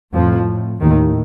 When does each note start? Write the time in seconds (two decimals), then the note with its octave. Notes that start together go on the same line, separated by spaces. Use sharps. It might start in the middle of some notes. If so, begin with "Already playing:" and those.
0.14 F2 A2 F3
0.82 D#2 A2 D#3